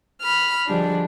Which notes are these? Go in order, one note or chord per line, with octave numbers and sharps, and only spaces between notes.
B5 F6
D3 F3 G3 G#3 D4